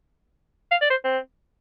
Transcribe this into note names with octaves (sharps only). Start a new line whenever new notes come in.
F5
D5
C5
C4